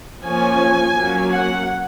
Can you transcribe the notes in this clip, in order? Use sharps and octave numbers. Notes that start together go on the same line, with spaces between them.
F3 A#3 C#4 G#5
F#3 A#3 C#4
F#5